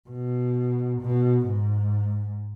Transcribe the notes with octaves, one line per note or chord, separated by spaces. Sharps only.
B2
B2
G#2